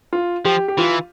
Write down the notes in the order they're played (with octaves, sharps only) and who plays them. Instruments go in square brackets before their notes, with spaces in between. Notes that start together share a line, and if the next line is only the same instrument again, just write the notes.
[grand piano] F4
[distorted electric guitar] F3 [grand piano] G4
[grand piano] G4
[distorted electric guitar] E3 [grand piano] F4